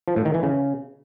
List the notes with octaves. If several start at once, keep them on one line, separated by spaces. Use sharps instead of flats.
F3
A2
D#3
E3
C#3